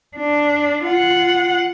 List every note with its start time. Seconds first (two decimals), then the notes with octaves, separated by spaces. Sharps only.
0.16 D4
0.84 F4 F#5